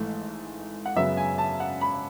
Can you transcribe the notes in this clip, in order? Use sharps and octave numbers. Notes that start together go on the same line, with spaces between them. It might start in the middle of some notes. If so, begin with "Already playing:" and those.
Already playing: G#1 G#2 E3 A3
F#5
F#2 C#3 F#3 B3 E5
G#5
A5
F#5
B5